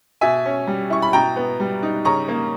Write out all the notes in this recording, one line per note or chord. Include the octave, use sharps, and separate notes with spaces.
B2 E5 G#5
C#4
G3
E4 C#6
B5
B2 G5 A#5
B3
G3
D#4
C#3 A#5 C#6
A#3